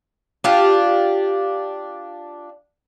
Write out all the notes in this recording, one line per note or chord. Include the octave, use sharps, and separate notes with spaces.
D4 F4 G4